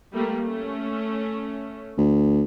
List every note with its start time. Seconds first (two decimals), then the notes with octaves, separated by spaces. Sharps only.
0.12 G3 A3 A#3
0.42 A3 C#4
1.98 D2